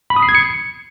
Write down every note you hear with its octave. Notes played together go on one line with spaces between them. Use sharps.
B5
D#6
C7
G#6
C#7